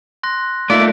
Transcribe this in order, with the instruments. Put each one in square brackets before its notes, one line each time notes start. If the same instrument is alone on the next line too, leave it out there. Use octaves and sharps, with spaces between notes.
[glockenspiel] C6 F#6 A#6
[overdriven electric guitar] A3 A#3 [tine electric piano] D#4 F4 E5 [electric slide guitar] D5